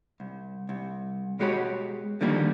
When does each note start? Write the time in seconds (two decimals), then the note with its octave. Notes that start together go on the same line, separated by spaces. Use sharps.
0.20 C2
0.69 C2
1.39 B2 G#3 F#4 G4 C#5 B5
2.21 D3 D#3 F3 G3 A#3